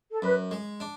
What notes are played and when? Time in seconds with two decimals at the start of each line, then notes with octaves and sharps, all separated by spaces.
0.12 A4
0.22 F#2 B4
0.51 G#3
0.80 D4